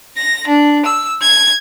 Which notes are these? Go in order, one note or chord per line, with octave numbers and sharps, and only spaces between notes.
A#6
D4
E6
G#6